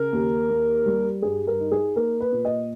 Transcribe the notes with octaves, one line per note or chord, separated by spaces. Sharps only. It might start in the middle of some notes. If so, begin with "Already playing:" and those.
Already playing: C#3 A#4
D#2
A#3
G3
G2 G#4
A#4
D#4
G#4
A#3 A#4
B4
A#2
D#5